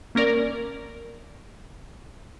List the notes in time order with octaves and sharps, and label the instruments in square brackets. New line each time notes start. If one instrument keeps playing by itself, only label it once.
[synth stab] A#3 C#4 A#4 D5